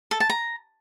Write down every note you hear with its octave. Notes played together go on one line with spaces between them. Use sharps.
A4
A5
A#5